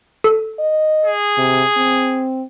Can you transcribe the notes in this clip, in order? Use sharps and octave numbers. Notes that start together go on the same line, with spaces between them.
A4
D#5
G#4
C3
C4